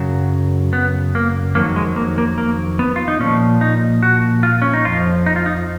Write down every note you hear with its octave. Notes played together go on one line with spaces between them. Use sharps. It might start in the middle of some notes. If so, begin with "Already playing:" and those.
Already playing: F#2 C#3 F#3
B3
A#3
F2 D#3 F#3 A#3
G#3
A#3
A#3
A#3
B3
F4
D#4
A#2 F3 C#4
D#4
F#4
F4
C#4
D#4
F2 F3 F4
D#4
F4
D#4